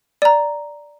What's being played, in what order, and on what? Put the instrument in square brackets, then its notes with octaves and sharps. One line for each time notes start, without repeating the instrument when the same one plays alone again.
[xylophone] D5 A#5